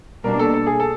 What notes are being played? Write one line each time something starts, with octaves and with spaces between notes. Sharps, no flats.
B2 G3 A#3 D4 A#4
A4
A4
G#4
A4